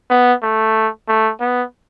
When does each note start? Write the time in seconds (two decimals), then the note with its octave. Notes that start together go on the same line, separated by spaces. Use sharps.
0.10 B3
0.43 A3
1.08 A3
1.41 B3